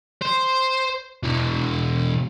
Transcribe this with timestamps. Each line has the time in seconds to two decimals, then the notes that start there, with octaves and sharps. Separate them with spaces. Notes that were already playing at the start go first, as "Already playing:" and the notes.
0.21 C5
1.23 B2 E3